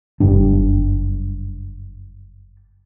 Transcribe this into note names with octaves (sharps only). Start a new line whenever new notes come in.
F#1 G2 G3 D4